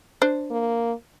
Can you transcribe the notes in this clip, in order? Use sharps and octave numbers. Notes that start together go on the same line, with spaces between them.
D4 C5
A#3